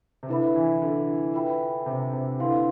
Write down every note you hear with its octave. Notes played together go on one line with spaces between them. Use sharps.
C3
D3 E4 B4 E5 B5
E3
D3
F4 B4 E5 G5 B5
C3
C3
D3 E4 B4 F5 C6